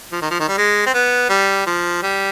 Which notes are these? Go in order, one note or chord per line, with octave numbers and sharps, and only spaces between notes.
F3
D#3
F3
D#3
G3
G#3
C4
B3
G3
F3
G3